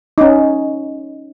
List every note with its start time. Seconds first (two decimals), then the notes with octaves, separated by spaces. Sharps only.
0.18 C#4 D#4